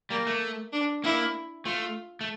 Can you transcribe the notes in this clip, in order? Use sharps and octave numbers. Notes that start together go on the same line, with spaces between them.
G3 A#3
A3
D4
A#3 E4
A3 F4
A3